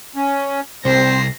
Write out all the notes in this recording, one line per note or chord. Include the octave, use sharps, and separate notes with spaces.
C#4
C2 C4 C5 A#6 C7